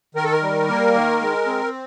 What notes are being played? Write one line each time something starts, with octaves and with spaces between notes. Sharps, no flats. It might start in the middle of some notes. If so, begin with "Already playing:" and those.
D#3 A#4
A4
A#4
G3
A#3
D#3
G#3
C4